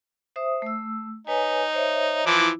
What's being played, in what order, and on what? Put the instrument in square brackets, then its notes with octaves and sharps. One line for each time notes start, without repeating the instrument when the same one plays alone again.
[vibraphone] C5 E5 D#6
A3 E6
[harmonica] D#4 [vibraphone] B4 C#5 G#5
[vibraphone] C5 C#5 E5
[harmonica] E3 F3 D6 [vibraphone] E4